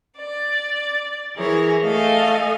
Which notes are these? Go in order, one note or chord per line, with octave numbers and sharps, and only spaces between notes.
D5
E3 E4 G#4 A#4 C#5
A3 A4 D#5 F5 G#5